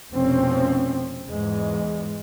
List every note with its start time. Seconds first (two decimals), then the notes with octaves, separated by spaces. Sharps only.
0.12 F1 B2 F3 C4 C#4
1.27 E2 G#2 G#3